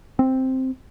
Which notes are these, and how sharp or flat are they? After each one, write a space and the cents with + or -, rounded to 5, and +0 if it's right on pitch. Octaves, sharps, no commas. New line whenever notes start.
C4 +0